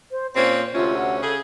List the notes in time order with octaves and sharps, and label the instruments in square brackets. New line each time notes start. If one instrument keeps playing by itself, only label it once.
[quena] C5
[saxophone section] A#2 C4 C#4 [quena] C5
[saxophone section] D2 C3 C#4 [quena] F4
[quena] F#5
[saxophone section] C#3 G#4 [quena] A4